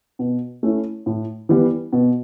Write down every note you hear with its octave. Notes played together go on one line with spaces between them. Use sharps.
B2
A3 C#4 E4
A2
E3 G3 B3
B2